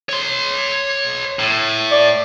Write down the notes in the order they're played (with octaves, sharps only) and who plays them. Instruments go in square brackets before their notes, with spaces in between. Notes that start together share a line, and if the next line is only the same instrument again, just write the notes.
[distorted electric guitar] C#5 C6
A2
[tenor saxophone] D5